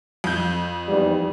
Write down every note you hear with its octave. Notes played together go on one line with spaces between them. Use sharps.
F2 G6
E2 G#2 G3